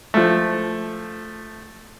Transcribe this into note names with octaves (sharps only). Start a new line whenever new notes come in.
F3 A3